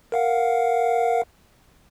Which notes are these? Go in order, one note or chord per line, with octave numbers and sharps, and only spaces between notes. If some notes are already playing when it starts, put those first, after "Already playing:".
A#4 F5 F#5